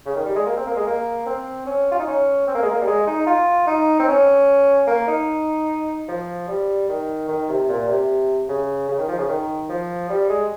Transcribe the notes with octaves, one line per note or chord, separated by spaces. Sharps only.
C#3
D#3
G3
G#3
A#3
C4
A#3
G#3
A#3
C4
C#4
F4
D#4
C#4
C4
A#3
G#3
A#3
G3
G#3
D#4
F4
D#4
C4
C#4
A#3
D#4
F3
G3
D#3
D#3
C3
A#2
C3
C#3
C#3
D#3
F3
C#3
D#3
F3
G3
G#3